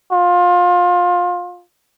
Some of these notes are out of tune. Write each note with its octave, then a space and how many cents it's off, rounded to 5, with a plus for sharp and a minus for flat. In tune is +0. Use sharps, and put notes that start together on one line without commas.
F4 +25